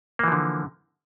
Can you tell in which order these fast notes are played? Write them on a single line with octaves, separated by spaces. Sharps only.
A#3 E3 F3 D3